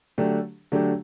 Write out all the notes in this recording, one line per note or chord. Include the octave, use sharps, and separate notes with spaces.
D3 F#3 A3 D4 G4
D3 F#3 A3 D4 G4